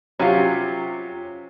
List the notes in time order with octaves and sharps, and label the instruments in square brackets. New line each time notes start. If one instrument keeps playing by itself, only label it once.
[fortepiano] C3 F#3 [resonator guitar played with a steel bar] C#4 F4